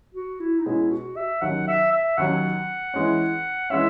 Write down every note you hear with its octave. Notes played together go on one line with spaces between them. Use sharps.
F#4
E4
D#4
B2 G#3 C#4 E4 G#4
F#4
E5
D#2 D#3 F#3 C#4 F#5
E5
E5
D#2 D#3 F#3 C#4 F#5
E3 G#3 C#4
E3 G#3 C#4 E5